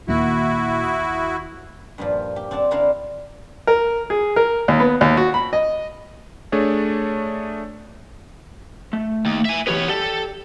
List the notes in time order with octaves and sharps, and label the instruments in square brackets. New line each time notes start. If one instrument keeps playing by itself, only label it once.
[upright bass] D#2 [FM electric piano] A#2 D#3 A#3 [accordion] E4 F#4
[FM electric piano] D#6
[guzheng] G2 A#2 F3
G4
C4 D4 D5 F#5 A5
C3 D4 E4 A#4 D5 F5
[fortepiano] A#4
G#4
A#4
D#2
B3
D#2
F#4
B5
D#5
[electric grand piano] A3 D4 G#4 C#5
[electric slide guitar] A3
[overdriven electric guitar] D#2
E5 G#5
[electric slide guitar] E3 G4 B4 [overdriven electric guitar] B3 C#5
[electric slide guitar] G4 D5 G5 [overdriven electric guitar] A4